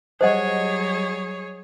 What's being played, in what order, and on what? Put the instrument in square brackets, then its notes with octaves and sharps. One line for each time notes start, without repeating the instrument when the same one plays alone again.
[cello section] F#3 G3 [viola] G#4 C#5 [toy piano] C5 D#5 F#5